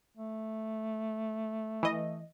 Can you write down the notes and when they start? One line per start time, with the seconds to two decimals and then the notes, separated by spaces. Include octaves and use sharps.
0.17 A3
1.83 E3 D#5